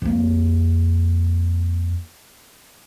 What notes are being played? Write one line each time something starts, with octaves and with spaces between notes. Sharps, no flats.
F2 A#3